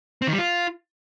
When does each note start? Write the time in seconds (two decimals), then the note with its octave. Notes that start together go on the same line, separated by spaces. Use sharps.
0.22 C4
0.27 D#3
0.33 G3
0.38 F4